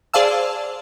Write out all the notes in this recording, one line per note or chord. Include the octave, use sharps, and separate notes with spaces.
G#4 C5 D5 F5 A5 E6